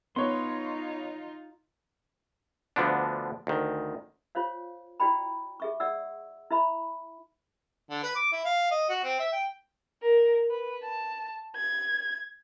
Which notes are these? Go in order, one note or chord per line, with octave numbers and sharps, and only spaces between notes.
B3 D#4 F4 C#5 C6
D2 D3 F3 B3 D4
D2 D#3
F4 C5 C#5 F5
E4 F#4 D5 G5 B5
G#4 E5 C#6
D5 E5 F#5 E6
E4 E5 B5
D3
B4
D6
E4
F5
D#5
F#4
C4
E5
G5
A#4
B4
A5
G#6